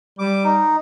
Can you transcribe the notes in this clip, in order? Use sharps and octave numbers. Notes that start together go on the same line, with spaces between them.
G3 D6
D#4